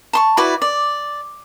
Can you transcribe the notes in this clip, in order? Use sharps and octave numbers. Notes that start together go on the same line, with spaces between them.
A5 C6 C#6
E4 F#4 B4 D5
D5